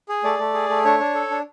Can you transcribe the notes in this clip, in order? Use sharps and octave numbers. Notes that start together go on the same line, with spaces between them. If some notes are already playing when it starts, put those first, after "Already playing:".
G#4
A3 D5
A3
G#4
A3
D4 C#5
D4
A4
D4